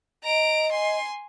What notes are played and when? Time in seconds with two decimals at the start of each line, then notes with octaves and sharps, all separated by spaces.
0.24 D#5 A#5 D7
0.72 G#5 C6